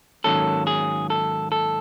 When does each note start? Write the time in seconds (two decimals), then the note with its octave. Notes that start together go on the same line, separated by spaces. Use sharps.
0.24 G#2 D#3 F#3 A#3 C#4 A4
0.67 G#4
1.10 A4
1.52 A4